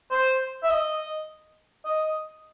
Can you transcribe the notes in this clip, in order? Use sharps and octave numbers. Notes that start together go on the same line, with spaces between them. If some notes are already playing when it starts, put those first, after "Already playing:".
C5
E5
D#5
D#5